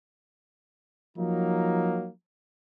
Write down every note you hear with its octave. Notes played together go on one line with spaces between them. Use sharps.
F3 F#3 A#3 D#4